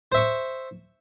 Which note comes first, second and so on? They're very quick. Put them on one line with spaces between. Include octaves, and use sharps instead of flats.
C5 E5 C#6